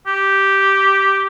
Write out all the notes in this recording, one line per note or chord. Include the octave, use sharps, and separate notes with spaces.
G4